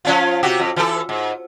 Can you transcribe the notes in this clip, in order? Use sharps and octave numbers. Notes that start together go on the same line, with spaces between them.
F3 C#4 F4
C3 F#4 G4
F2
E3 A4
G#2